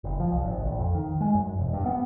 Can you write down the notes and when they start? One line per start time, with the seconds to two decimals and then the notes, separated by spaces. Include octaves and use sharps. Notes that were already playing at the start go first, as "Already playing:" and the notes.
0.04 F#1
0.20 F3
0.32 C2
0.45 G#1
0.65 A#1
0.79 F2
0.94 D#3
1.21 G#3
1.34 F#2
1.57 E1
1.73 G2
1.86 B3